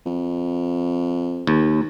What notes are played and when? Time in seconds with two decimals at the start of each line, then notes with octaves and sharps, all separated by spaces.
0.06 F2
1.47 D#2